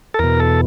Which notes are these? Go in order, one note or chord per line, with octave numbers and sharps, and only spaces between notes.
A4
E2 B2 A#4
A4